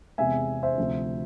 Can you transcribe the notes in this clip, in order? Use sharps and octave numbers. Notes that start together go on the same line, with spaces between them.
E2 C3 G#3 E5 G#5
C5 E5
D2 C3 F3